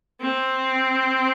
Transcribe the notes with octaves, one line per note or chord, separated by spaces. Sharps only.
C4